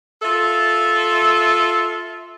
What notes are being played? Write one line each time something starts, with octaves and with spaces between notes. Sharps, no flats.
F4 A4 E5